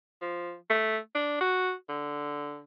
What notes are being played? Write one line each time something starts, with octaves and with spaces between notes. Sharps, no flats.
F3
A3
D4
F#4
D3